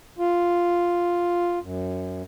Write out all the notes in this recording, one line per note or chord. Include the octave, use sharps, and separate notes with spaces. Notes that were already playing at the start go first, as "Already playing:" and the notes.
F4
F#2